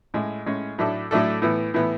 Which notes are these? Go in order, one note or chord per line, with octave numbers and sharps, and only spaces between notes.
A2 G#3 C#4
A2 G#3 C#4
A2 F#3 A3 D4 A4
A2 F#3 A3 D4 A4
A2 E3 B3
A2 E3 B3